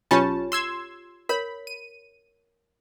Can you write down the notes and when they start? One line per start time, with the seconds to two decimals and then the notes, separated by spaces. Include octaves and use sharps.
0.11 B1 C#4 F4 G4 C#5 A5
0.52 C6 E6 G#6
1.29 A#4 C#5 B5
1.67 D#7